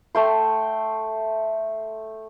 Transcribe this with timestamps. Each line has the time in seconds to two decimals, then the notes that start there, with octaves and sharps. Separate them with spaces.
0.15 A3 G5 C6